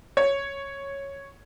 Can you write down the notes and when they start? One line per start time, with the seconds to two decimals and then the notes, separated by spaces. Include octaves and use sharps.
0.17 C#5